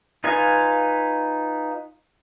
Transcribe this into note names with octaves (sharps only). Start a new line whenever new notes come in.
D#4 F4 B4 F5 G#5